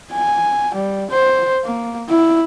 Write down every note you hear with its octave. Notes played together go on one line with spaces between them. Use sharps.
G#5
G3
C5
A#3
E4